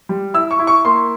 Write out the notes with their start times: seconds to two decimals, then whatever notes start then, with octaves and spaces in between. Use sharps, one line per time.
0.09 G3
0.34 E4 E6
0.51 C#6
0.59 E4
0.67 C#6
0.85 A#3 C6